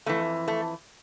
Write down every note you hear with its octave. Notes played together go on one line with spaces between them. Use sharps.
F2 E3 A3
A3